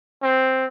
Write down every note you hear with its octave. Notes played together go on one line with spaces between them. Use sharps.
C4